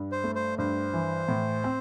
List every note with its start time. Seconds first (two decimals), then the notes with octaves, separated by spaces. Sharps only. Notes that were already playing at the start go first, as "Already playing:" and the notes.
Already playing: G2
0.12 C5
0.24 A3
0.35 C5
0.58 G2 C5
0.93 E3
1.28 A2
1.64 C4